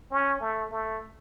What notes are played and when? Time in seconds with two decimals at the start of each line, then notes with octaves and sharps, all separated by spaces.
0.11 C#4
0.41 A3
0.71 A3